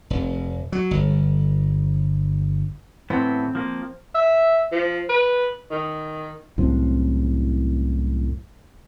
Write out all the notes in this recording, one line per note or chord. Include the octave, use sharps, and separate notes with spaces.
F1
F#3
G1
A2 E3 B3 C4
F3 A#3
E5
F3
B4
D#3
C2 F#2 A2 C4